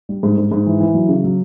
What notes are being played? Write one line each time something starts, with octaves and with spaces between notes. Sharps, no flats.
G3
G#2
G#2
G#2
E3
E3
F#3
C#3
F#3